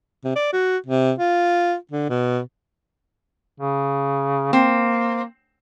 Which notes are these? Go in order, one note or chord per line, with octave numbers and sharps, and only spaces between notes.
C3
D5
F#4
C3
F4
D3
B2
C#3
A#3 C4